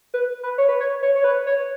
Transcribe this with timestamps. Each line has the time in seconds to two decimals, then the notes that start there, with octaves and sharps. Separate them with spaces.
0.14 B4
0.43 B4
0.58 C#5
0.68 B4
0.80 C#5
1.02 C#5
1.15 C#5
1.24 B4
1.46 C#5